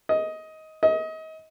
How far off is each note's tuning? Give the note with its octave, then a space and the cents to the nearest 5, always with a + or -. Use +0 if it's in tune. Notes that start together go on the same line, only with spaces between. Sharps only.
D#5 +15
D#5 +30